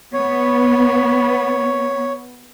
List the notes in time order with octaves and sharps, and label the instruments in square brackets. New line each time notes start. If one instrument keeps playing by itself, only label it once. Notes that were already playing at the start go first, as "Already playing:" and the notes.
[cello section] B3 [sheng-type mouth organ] C#5